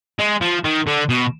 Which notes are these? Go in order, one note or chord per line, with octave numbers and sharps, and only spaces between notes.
G#3
F3
D#3
D3
B2